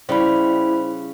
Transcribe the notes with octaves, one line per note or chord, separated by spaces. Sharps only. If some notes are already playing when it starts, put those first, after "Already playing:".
C#3 G3 E4 C5 B5